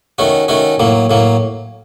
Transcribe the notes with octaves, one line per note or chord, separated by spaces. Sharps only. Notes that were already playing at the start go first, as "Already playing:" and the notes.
D#3 A3 C#4 F#4
D#3 A3 C#4 F#4
A2 F#3 A#3
A2 F#3 A#3